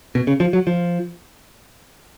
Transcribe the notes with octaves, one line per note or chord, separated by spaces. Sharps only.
B2
C#3
F3
F#3
F3